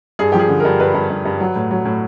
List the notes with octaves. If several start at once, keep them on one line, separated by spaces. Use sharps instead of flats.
G2 G#4
G4
F3 G#4
D3
G2 A#4
G2 B4
G2
G2
G2
F#3
A2
F#3
A2